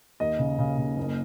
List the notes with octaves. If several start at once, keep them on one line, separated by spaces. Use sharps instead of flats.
D#2 D#5
C#3
C#3
C#3
F#1